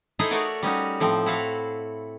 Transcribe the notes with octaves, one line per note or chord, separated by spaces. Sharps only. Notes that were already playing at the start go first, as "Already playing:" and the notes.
D#4 E4 G#4 A4 C5 D#5
A3 F#4 A#4 C#5 D5
G3 C#4 D#4 F#4
A2 F3 C4
E4 F#4 A4 E5 F5